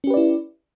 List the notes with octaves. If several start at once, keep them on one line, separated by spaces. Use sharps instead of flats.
C#4 E4 G4 B4 D5